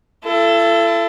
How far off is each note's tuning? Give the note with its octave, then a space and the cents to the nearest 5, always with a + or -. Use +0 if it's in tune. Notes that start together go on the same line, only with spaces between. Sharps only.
E4 +45 A4 +5